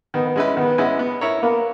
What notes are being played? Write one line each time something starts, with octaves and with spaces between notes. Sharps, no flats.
D#3 B3
G#3 C#4 E4 B4
D#3 B3
G#3 C#4 E4 B4
B3
E4 A#4 C#5
A#3 B3